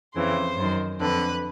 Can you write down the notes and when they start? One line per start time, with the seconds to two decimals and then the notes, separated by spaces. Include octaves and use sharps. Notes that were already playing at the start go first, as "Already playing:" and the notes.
0.15 F2 C#3 E3 C5
0.57 F#2 D#3
1.00 F2 D3 B4